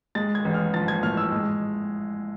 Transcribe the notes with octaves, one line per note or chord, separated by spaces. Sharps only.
G#3 A6
G#6
A1
F6
F3 A6
G#6
A2 F6
E6
G#3